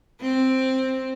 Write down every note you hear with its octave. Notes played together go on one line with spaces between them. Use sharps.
C4